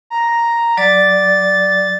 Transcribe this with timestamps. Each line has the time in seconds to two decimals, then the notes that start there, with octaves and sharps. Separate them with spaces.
0.10 A#5
0.77 F#3 D5 D6 A6